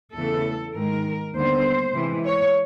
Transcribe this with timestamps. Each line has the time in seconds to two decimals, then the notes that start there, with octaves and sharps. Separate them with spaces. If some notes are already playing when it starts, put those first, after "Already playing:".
0.15 E2 C#3 E3 A3 A4
0.76 G#2 D#3 G#3 A#4
1.35 D#2 D3 G3 B3 C5
1.94 C3 E3 G#3
2.25 C#5